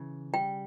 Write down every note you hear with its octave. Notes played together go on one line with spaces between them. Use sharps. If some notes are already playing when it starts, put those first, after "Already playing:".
Already playing: C#3 E3
G3 G5